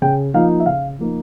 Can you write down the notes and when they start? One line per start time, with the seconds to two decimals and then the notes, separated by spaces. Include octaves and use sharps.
0.02 C#3 G5
0.34 F3 A#3 D#4 F5
0.60 E5
0.66 C#3 F5
0.99 F3 A#3 D#4